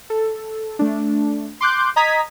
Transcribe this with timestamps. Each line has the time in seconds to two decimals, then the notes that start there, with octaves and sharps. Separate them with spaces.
0.10 A4
0.79 A3 D4
1.61 C6 D6 F#6 G6
1.96 D#5 A#5 D#6 G#6 B6